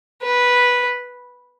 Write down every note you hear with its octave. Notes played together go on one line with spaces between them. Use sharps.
B4